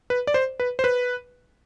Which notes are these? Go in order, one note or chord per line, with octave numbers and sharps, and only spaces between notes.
B4
D5
C5
B4
C5
B4